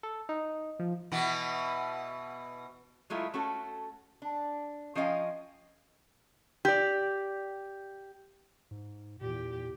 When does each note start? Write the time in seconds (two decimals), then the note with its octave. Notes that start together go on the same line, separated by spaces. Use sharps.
0.03 A4
0.29 D#4
0.79 F3
1.12 B2 E3 B3
3.10 F#3 G#3 A3 E4 F4
3.34 A3 C#4 F#4 A4
4.22 D4
4.95 F3 C#4 D#5 F5 G5
6.65 G4 D5
8.71 G#2
9.21 E2 A#2 G4